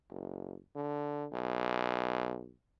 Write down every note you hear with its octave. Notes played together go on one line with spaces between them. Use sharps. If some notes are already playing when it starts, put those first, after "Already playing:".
F#1
D3
B1